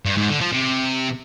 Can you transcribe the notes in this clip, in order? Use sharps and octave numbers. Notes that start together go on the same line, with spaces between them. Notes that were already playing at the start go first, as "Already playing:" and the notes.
G2
G#2
D3
F3
C3